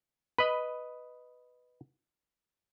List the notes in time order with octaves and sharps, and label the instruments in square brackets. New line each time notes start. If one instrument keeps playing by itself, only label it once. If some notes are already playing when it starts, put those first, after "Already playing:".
[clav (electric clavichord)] B4 D#5 [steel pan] B5